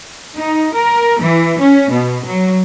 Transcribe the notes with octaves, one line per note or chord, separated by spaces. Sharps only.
D#4
A#4
E3
C#4
B2
F#3